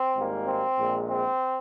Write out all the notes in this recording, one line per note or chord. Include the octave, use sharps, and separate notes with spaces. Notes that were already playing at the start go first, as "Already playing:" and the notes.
Already playing: C4
G#1 G#2 G3 A#3
C4
A#1 A#2 G#3
C4